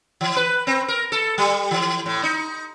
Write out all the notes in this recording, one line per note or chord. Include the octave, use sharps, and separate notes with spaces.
E3
B4
C4
A#4
A4
G3
E3
A2
D#4